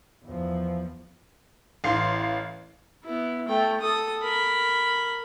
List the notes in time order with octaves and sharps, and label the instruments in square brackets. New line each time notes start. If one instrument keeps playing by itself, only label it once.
[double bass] E2 F3
[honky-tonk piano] A1 F5 C6
[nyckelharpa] B3 E4
A3 G5
A4 D#6
A#4 B5